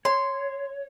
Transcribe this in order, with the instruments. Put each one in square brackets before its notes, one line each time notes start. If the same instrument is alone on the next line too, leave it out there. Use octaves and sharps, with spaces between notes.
[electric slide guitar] C#5 [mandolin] C6